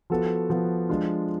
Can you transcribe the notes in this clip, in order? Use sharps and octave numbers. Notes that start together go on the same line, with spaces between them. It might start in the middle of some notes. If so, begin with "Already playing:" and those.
F3 B3 F#4 A4
F3 B3 F#4 A4
F3 G#3 D4 F4